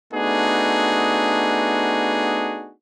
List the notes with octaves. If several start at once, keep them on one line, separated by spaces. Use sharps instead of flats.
A3 B3 D4 D#4 F#4 G#4